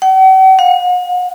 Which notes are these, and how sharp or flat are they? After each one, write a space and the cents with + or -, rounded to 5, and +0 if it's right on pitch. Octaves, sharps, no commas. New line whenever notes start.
F#5 +45
F#5 -45